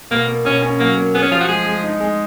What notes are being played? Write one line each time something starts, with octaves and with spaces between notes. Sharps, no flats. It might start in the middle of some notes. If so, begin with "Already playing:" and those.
B2 A#3
A#3
B2 C#4
C#4
F#3 A#3
A#3
B3 G#4
C#4
F3 F4
F#4
G#3 G#4
G#3
D#4
G#3